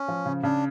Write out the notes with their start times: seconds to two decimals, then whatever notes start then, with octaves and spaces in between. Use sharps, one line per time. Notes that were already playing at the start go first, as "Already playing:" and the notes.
Already playing: C#4
0.08 F3
0.26 C#3
0.43 C#3 D4